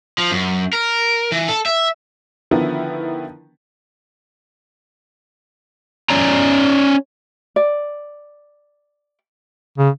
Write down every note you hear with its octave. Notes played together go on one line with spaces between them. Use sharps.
F3
F#2
A#4
E3
A4
E5
D3 D#3 F3 B3 E4 A#4
C#4 C#5 D5 A#5
D5
C#3